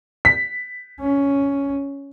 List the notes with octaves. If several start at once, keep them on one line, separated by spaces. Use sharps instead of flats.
B6
C#4